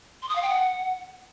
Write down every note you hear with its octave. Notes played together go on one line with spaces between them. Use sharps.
C6
D#6
F5
G5
F#5